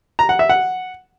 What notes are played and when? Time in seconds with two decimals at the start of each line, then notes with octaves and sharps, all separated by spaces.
0.19 A#5
0.29 F#5
0.39 E5
0.49 F#5